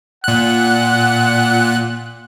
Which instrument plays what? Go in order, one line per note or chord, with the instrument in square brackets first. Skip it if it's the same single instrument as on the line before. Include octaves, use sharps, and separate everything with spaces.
[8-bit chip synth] A#2 F#6 [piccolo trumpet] F#5